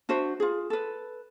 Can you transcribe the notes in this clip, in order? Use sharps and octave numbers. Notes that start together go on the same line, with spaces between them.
D4 F#4 C5 E5
F4 G#4
A4 B4